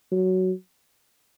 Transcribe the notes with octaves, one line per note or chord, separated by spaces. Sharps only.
F#3